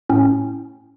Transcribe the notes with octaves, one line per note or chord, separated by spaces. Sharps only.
A2 C#4 G5